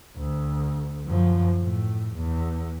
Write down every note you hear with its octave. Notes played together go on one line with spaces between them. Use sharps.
D2
F#2 F3
A2
E2